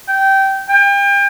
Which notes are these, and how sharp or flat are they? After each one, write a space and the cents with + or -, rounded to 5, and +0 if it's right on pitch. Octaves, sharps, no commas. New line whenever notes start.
G5 -15
G5 +35